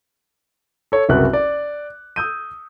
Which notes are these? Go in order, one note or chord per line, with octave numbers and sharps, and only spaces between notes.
A4 C#5
F#1 C2 F#4 B4 F#6
D5
D#6 E6 G6 D#7